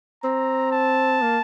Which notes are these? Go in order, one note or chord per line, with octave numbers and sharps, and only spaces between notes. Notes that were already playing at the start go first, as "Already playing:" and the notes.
C4 A#5
A5
A#3